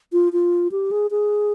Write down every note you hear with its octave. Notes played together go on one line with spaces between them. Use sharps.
F4
F4
G4
G#4
G#4